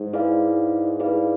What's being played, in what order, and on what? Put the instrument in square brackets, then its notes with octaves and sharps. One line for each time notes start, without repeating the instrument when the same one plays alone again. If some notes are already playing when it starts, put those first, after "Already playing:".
Already playing: [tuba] G#2
[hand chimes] E4 G#4 B4 D5 F5
E4 G#4 B4 D5 F5